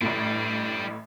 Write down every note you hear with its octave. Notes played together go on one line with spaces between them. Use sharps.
A1 A2 G3 D4